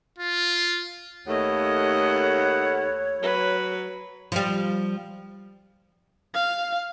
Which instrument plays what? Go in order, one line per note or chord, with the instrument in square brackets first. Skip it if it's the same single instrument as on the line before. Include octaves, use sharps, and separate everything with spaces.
[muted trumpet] F4
[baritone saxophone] D#2 [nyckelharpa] A3 D#5 [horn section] A4 F#5 B5 [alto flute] C#5
[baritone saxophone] F#3 [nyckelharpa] B4
[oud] F3 G3
[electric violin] F5